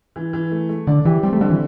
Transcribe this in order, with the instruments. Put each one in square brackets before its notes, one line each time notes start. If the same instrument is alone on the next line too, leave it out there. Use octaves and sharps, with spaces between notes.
[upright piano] E3
E3
A3
A3
[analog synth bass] D3 [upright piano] D5
[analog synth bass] E3 [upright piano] G4
[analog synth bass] G3 [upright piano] C4
[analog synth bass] A3
[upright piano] D3 [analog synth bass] G3
[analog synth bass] E3